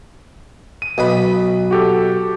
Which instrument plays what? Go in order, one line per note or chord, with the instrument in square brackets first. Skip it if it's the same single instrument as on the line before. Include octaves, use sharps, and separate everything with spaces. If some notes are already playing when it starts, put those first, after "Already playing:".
[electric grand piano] D#7
[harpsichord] B1 B5 [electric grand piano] B4 D#5
[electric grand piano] F#4 G4 A4